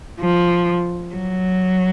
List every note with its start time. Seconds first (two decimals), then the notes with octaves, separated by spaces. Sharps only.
0.20 F3
1.15 F#3